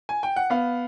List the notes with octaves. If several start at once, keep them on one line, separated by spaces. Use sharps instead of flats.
G#5
G5
F#5
B3 F5